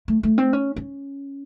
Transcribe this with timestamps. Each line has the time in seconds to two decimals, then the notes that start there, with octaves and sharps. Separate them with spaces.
0.08 A3
0.23 A3
0.38 C4
0.53 C#4
0.76 C#4